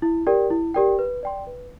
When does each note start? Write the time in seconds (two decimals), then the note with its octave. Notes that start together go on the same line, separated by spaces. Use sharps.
0.02 E4
0.27 G4 A#4 D5 G5
0.50 E4
0.74 G4 A#4 D5 G5
0.99 B4
1.23 D5 G5 C6
1.47 B4